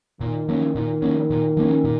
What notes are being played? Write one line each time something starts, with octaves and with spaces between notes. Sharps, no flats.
A#2 D#3
F3 A#3 C#4
A#2 D#3
F3 A#3 C#4
A#2
F3 A#3 C#4
A#2